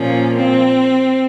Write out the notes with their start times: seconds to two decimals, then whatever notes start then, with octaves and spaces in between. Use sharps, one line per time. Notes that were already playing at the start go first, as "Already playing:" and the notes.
Already playing: A#2 F3 A#3 C#4
0.35 C4